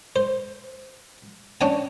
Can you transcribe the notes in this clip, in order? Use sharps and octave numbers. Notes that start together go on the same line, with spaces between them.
C5
C#4 D4 G5 G#5